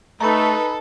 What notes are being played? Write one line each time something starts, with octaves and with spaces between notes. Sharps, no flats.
A3 D#4 A4 B4 A#5 B5